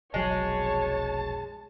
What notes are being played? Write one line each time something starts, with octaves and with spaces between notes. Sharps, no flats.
F1 B1 F#3 G#3 C#5 A5